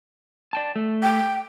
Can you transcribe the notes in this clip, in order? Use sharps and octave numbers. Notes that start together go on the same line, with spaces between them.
D5 G5 A5
A3
G5